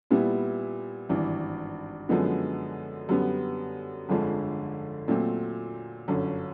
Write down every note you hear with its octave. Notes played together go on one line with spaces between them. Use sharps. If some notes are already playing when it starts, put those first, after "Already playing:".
A#2 G3 B3 E4
G#1 G2 E3
F#2 D3 F3 G#3 B3
F#2 D3 G3 B3
G1 F2 D3 F3 G#3
A#2 F#3 A3 C4
G1 F#2 D3